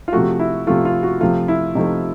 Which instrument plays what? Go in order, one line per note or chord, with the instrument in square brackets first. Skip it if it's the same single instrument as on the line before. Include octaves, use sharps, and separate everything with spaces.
[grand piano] F4
C3 F3 A3 F#4
E4
C3 F3 A3 F4
F4
F#4
C3 F3 A3 F4
E4
C3 F3 A3 D#4